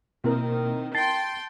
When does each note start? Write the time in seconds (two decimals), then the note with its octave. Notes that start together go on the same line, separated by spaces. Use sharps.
0.24 B2 D#3 A#3 C4 E4 A#4
0.95 G5 A5 C6 A6 C7